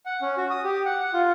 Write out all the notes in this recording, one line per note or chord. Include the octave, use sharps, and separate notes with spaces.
F#5
C#4
F#4
D#6
G4
F#5
F#5
F4